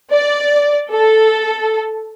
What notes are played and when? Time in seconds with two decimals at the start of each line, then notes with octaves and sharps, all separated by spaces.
0.12 D5
0.91 A4